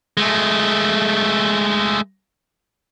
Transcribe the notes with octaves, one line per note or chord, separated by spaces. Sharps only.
G#3 A3